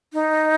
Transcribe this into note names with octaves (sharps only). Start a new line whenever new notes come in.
D#4